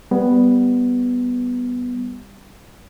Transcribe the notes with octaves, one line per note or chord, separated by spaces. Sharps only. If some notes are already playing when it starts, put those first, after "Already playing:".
G3 B3